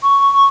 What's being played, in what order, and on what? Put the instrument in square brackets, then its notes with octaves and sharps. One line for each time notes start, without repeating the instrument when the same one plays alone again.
[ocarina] C#6